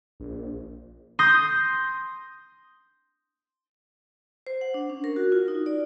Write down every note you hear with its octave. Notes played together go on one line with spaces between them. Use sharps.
A#1
C6 D#6 G6 A#6
C5
F#5
D4
C#4
A#4
F#4
F4
D#4
D5